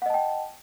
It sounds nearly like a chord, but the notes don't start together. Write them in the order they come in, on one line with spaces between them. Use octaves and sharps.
F#5 D#5 A5 G5